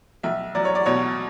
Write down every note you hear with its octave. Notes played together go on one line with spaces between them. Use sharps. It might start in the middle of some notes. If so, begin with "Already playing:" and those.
B1 E5
F#3 D5
C#5
D5
B2 C#5